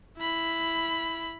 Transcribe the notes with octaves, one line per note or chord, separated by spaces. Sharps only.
E4 B5